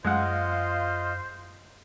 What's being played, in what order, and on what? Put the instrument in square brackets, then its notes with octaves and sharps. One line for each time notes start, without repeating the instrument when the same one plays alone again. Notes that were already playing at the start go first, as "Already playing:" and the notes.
[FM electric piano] F#2 [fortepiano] G#3 F#5 [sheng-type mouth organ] F4 D#5 F5 [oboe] C5